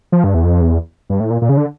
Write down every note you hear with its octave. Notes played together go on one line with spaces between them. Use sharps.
F3
G2
E2
F2
E2
G2
A2
A#2
A#2
C#3
D3